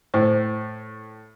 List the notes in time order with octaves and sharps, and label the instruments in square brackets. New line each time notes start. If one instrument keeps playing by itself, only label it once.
[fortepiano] A2 [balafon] C5